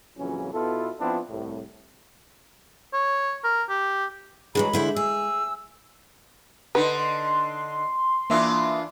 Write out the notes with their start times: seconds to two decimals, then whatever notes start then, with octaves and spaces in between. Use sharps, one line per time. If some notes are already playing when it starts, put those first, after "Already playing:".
0.18 F2 A#2 C#3 E3 F#3 C#4
0.53 B2 B3 E4 F4 A4
1.00 F3 B3 C4 D4 E4 F4
1.29 C2 A2
2.94 C#5
3.44 A#4
3.69 G4
4.55 D3 E3 F#3 G#3 B5
4.73 D3 E4 C5
4.96 G#4 E6
6.75 D3 D#4 B4 C6
8.30 E3 A#3 D4 F4 E5 D#6